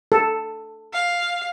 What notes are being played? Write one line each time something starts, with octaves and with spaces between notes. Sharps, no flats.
A4
F5